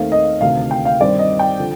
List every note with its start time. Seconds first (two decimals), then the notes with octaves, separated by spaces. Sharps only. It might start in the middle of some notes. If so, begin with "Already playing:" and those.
Already playing: D#2 D#3 A3 C4 F5
0.12 D#5
0.41 D2 C3 D#3 F5
0.71 G5
0.85 F5
1.00 G2 D#3 G3 C4 D5
1.19 D#5
1.39 G5
1.60 D3 F3